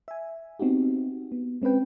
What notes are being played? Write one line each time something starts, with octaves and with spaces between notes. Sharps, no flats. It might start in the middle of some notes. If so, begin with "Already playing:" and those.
E5 G#5
B3 C4 D#4 F#4 G4
B3
G#3 C4 C#4 B4 G5